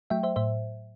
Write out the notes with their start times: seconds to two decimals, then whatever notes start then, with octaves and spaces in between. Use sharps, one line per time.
0.10 F#3 A3 E5 G5
0.23 C5 E5
0.36 A2 C5 E5